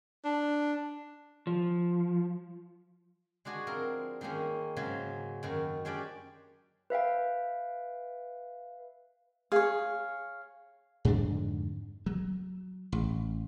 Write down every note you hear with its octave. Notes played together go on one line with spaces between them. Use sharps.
D4
F3
G#3 D4 F#4 G#4
F3 C4 A#4
D#3 G#3 A#3 C#4 D#4
G#2 C#3 F#3 G#3
F#2 D#3 F#4
G#3 C#4 D4 G4 D5
B4 E5 F5 G5
G#4 C#5 F5
F2 G#2 D3 D4
F#3
A1